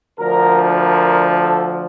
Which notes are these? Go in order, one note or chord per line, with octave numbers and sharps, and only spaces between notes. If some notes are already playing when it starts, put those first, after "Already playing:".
D2 D3 F3 A#4
A#4
A4